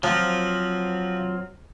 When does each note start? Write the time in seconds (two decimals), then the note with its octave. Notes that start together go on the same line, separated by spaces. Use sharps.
0.03 F3 F#3 C4 F4